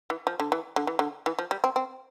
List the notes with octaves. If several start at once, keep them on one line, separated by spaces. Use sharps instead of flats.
E3
F3
D3
E3
D3
E3
D3
E3
F3
G3
C4
C4